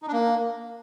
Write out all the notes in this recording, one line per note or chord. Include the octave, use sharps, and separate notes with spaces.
D#4
D4
A#3